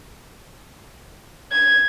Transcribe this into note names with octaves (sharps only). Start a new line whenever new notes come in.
G#6